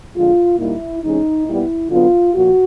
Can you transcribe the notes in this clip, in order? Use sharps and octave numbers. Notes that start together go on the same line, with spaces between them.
F2 D3 F3 G#3 F4
A#2 G3 A#3 D#4 E4
C3 E3 G#3 C#4 D#4
A#2 G3 B3 E4
D3 F#3 B3 F4
A#2 F3 F#4